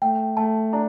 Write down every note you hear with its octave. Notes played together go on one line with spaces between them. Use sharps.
A3 G5
A3 A5
D4 A#5